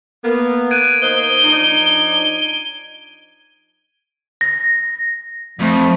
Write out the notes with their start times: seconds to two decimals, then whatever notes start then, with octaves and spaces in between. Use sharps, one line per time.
0.25 A#3 B3
0.71 F#6 G#6 D7 D#7
1.02 A#3 D#4 C5 G7
1.44 F3 D4 D#4
4.41 A#6
5.59 F2 F3 A3